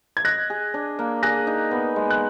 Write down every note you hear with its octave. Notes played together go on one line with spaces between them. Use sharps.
G#6
D#5 F#6 A#6
G#4
D4
A#3
G#4 F#6 A#6
D#4
B3
G#3
F#6